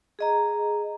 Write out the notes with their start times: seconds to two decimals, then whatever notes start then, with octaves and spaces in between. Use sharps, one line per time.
0.19 G#4 D#5 A#5